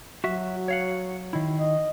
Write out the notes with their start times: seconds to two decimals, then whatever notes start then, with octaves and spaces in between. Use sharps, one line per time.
0.24 F#3 F#4 E5
0.68 C#5 F5 F#5
1.33 D#3 E4
1.58 D#5